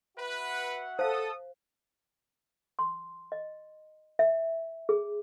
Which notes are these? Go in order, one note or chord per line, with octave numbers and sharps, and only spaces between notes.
F#4 B4 E5 F#5
A4 C5 F5 D#6
C6
D#5
E5
G#4